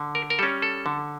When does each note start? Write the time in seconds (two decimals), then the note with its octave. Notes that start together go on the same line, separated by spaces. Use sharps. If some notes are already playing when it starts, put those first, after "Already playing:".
Already playing: D3
0.15 A#4
0.30 A#4
0.39 G3 C#4 A4
0.62 A4
0.86 D3